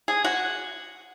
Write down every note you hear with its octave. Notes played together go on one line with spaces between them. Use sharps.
G#4
F#4